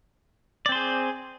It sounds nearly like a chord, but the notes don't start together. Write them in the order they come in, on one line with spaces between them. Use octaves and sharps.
D5 C4 C5 G#4